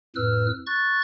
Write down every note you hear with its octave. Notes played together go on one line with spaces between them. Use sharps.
F2 A2 B4 E6 F6
C#6 F#6 A6